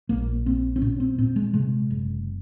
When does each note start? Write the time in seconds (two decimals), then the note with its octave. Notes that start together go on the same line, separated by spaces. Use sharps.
0.09 A#1 A#3
0.46 A#1 C4
0.76 C4
0.82 A#2 C#4
1.00 C4
1.18 A#2 C4
1.36 G#3
1.54 C3 G#3
1.91 F#1